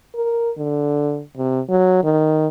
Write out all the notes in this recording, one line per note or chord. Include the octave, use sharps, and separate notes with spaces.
A#4
D3
C3
F#3
D#3